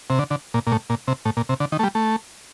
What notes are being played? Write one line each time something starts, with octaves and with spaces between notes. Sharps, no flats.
C3
D3
D3
A#2
A#2
A2
A#2
C3
A2
A#2
C3
D3
D#3
A3
G3
A3